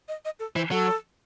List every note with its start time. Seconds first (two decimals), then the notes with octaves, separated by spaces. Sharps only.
0.08 D#5
0.25 D#5
0.39 A4
0.56 E3 C5
0.71 F#3 A4